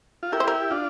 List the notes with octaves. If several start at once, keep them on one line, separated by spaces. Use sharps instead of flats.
F4
E4 G4 A#4
C5
A#4
D4 F4